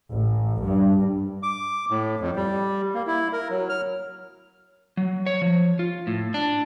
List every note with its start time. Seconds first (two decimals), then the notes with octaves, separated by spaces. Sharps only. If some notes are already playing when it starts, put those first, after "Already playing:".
0.11 A1
0.61 G2
1.43 D6
1.90 A2
2.21 F2
2.36 G3
2.94 A#3
3.07 E4
3.33 A#4
3.50 F#3
3.69 F6
4.97 F#3
5.26 C#5
5.42 F3
5.79 F4
6.07 A2
6.34 D4